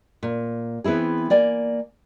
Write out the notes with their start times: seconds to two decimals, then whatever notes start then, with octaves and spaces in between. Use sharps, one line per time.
0.23 A#2
0.84 E3 B3 C4 E4 G#4
1.30 A#3 D5 G#5